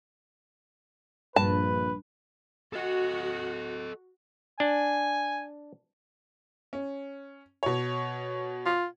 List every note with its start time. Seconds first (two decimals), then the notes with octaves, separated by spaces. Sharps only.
1.36 A#1 G2 B4 A5
2.73 F#4 A4 D#5
4.60 D4 G#5
6.73 C#4
7.63 B2 C#5
8.66 F4